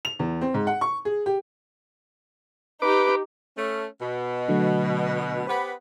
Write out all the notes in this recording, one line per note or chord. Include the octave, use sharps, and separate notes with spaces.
F7
E2
C4
G#2
F#5
C#6
G#4
G4
D#4 G4 B4 D6
A3 C#4
B2
D3 F#3 A3
B3 G4 B4 C5 F#5